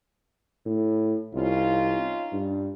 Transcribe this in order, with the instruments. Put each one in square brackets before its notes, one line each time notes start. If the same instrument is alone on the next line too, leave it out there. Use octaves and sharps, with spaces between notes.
[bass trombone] A2
[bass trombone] C2 [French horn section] C#4 D#4 F4
[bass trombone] G2